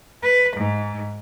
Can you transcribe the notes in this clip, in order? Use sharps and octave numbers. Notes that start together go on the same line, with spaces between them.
B4
G#2